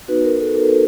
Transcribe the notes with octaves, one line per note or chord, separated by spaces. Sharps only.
B3 D#4 F#4 B4
A#4
A4